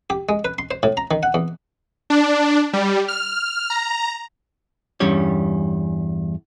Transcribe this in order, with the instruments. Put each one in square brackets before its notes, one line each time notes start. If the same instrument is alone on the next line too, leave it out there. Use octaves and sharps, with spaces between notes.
[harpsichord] G4
G#3
B4
C6
C5
A2
A#5
D#3
F#5
E2
[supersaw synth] D4
G3
F6
A#5
[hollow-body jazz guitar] E2 G2 G3 C#4 C#5